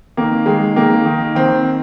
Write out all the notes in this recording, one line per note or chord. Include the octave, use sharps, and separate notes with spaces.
D#3 A#3
D#3 G#3
D#3 A#3
D#3
D#3 C4